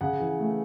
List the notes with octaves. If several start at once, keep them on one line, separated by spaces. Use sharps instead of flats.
C#3 F#5
E3
A3